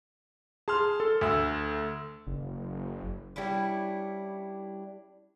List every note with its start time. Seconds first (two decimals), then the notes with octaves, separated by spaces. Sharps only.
0.68 G#4 A5 C6 F6
1.00 A4
1.21 D2 A3 E6
2.27 F#1
3.36 G3 C#4 D4 E4